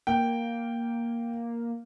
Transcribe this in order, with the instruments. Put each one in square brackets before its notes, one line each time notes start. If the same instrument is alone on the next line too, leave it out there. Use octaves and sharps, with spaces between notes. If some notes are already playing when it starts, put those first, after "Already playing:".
[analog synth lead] A#3 [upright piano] G5